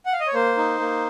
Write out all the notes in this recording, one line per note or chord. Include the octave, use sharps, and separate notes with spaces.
F#5
F5
D#5
C#5
A#3 C5
D#4
A#3